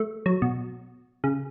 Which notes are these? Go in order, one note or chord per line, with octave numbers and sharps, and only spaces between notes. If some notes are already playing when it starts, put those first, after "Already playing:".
Already playing: A3
F#3
B2
C#3